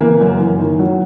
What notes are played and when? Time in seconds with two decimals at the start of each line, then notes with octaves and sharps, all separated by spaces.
0.01 E3 A#3
0.21 F#2
0.40 E3
0.59 D#3
0.79 F#3